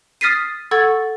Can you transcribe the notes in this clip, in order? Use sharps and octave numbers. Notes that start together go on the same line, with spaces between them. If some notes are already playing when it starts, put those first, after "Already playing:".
D#6 F6 A6 B6 C7 D#7
A4 F#5 C#6 E6 G#6 A6